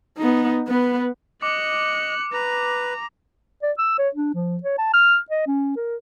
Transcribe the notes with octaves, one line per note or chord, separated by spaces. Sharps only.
B3 D#4
B3 B4
D#5 D6 F#6 C#7
B4 A#5
D5
E6
C#5
D4
F3
C#5
A5
F6
D#5
C#4
A#4